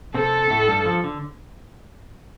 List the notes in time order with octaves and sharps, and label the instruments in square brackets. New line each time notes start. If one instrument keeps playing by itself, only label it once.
[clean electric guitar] C3 C4 [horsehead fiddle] A4
[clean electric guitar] A2 A3
G2 G3
F3
D3